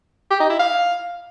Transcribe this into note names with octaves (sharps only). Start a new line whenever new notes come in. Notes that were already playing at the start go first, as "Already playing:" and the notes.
G4
D#4
E4
F5